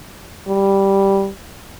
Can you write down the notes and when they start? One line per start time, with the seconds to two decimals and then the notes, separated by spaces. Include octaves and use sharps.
0.48 G3